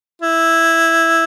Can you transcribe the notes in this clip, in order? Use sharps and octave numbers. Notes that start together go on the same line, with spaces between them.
E4